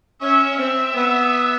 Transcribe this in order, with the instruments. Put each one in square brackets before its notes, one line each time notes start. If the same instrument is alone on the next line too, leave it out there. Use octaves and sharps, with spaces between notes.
[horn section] C#4 [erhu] E5
[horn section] C4 [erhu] E5
[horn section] B3